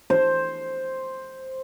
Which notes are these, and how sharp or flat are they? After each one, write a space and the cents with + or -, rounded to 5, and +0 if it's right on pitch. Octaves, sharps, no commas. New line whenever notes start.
C5 +5